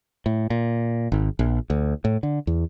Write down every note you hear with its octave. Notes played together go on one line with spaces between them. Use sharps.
A2
A#2
G#1
A#1
D2
A2
D3
E2